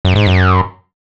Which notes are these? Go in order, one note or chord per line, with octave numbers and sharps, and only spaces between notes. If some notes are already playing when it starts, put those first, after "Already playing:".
F#2
G#2
F#2